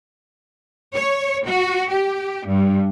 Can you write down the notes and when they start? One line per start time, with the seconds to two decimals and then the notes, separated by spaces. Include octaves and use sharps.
0.95 C#5
1.46 F#4
1.91 G4
2.47 G2